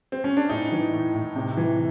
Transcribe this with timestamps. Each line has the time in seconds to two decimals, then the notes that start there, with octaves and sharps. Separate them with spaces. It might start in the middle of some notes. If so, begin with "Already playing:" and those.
0.12 C4
0.24 C#4
0.37 D4
0.49 A2 D#4
0.72 E3
0.93 A2
1.15 A2
1.36 C3
1.57 E3